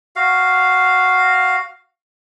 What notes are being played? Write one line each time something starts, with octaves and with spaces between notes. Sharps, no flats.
F#4 F5